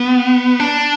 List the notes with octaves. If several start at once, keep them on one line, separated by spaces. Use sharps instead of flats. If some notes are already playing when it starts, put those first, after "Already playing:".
Already playing: B3
D4